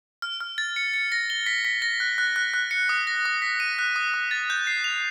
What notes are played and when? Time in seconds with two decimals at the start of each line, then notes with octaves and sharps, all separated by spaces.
0.22 F6
0.41 F6
0.58 A6
0.76 C#7
0.94 C#7
1.12 A#6
1.30 G7
1.46 B6
1.65 B6
1.82 A#6
2.00 F#6
2.18 F#6
2.36 F#6
2.54 F#6
2.71 C#7
2.89 D#6
3.07 A#6
3.25 D#6
3.42 B6
3.60 D#7
3.79 F#6
3.96 D#6
4.14 D#6
4.31 A6
4.50 G6
4.67 C7
4.84 F7